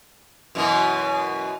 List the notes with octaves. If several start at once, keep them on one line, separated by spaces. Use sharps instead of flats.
F#2 B2 E3